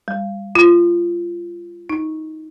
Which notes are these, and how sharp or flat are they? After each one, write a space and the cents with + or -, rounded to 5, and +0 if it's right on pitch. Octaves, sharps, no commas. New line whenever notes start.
G3 +30
F4 -15
D#4 +15